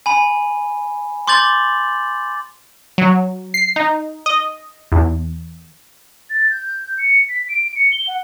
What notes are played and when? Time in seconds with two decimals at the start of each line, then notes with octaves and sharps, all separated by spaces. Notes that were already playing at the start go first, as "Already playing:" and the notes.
0.06 G#5 B5
1.27 C6 D6 G6 A6 F#7
2.98 F#3
3.54 C7
3.76 D#4
4.26 D#5
4.92 E2
6.30 A6
6.51 G6
6.98 C#7
7.29 B6
7.49 D7
7.76 C#7
7.92 G7
8.08 F#5